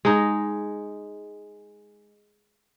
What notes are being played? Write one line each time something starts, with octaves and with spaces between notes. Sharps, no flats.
G#3 D#4